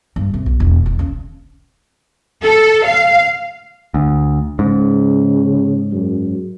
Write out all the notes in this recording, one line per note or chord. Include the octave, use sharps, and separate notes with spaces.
G2
C3
B1
E1
E2
C#3
A4
F5
D2
G#2 C#3
F#2